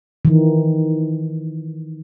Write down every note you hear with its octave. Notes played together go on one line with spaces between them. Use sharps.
D#3 E3